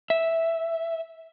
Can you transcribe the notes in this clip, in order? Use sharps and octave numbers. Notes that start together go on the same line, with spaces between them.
E5